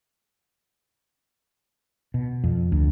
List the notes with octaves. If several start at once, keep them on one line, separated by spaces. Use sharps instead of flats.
B2
F2
D2